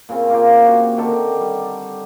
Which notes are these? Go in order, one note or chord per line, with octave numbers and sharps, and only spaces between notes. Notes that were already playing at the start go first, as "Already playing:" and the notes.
A#2 C#3 C4
A#3 F4 G4
F#4
D3 D#3 G4 A4
G3